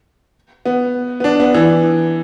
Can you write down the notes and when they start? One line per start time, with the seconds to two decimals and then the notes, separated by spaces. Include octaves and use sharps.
0.65 B3
1.20 B3
1.24 D4
1.40 B3
1.54 E3